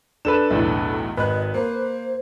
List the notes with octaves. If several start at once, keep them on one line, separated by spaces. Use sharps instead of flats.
D4 A4 B4 E7
B1 E2 A2
G#1 B4 D#5 F#6
A#3 C5